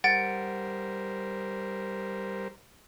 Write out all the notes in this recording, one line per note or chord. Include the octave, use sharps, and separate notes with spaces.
G3 A#4 C5 F#5 A6 D7